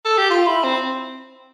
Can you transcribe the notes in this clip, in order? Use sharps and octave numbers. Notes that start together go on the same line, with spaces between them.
A4
G4
F4
E4
C4